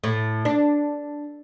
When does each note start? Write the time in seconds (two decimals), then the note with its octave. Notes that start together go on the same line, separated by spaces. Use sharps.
0.04 A2
0.45 D4